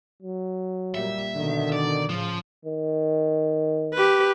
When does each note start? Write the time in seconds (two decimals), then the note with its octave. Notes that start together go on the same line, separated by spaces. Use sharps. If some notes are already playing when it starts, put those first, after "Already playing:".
0.22 F#3
0.95 A#2 G3 A#3 E5
1.36 B2 D3 D#3
1.72 D5
2.10 A2 C#3 F3
2.65 D#3
3.94 G4 B4